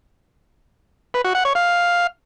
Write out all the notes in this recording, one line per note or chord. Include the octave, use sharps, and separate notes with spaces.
B4
F#4
F#5
C#5
F5